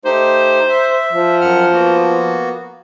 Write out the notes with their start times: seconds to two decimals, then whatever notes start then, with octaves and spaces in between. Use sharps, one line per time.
0.05 A3 D#4 G4 C5
0.69 E5
1.13 F3
1.41 F#2 F#5 F6
1.73 A#3 B3 F#4